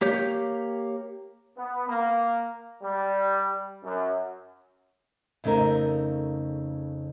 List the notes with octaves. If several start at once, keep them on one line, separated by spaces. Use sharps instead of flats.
A#3 G4 C#5 G6
B3
A#3
G3
F#2
F2 C#3 A3 D#4 A#4